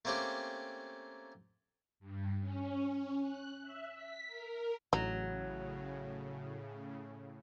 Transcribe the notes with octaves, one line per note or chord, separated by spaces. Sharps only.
A3 A#3 C4 C#4 G4
G2
C#4
C#4
F#6
E5
B6
A#4
A1 A2 C#3 F#3 D#4